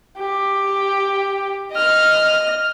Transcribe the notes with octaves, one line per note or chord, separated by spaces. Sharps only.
G4
D#5 F6